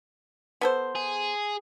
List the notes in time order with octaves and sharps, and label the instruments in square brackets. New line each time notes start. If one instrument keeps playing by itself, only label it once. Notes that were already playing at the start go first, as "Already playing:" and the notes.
[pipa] B3 A4 C5
[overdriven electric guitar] G#4